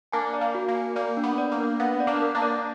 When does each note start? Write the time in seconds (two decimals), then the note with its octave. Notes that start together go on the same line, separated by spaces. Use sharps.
0.12 A#3 D4 G#5
0.34 D5
0.41 A#3
0.55 F#4
0.68 A#3
0.75 G#5
0.96 A#3 D5
1.17 D4
1.23 B3
1.38 D5
1.52 A#3
1.59 D4
1.80 B3 F5
2.00 D5
2.07 A#3 D4
2.22 A#4
2.35 A#3 D4
2.42 D5